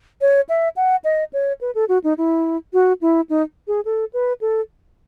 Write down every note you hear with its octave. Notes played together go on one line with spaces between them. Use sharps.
C#5
E5
F#5
D#5
C#5
B4
A4
F#4
D#4
E4
F#4
E4
D#4
G#4
A4
B4
A4